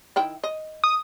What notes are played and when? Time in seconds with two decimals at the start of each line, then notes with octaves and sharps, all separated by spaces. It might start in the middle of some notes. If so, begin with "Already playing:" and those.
0.16 D#3 E4 G5
0.44 D#5
0.84 D#6